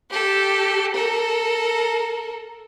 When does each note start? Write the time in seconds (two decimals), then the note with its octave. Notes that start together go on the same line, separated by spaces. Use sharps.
0.10 G4 A4
0.94 A4 A#4